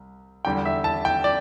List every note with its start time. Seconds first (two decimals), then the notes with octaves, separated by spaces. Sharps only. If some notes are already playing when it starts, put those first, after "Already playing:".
Already playing: C2
0.45 E2 D3 G3 G5
0.65 E5
0.84 A5
1.05 G5
1.24 D5